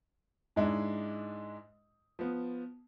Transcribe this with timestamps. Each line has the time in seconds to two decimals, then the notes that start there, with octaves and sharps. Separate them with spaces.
0.56 G#2 G#3 D4 E4
2.19 F3 B3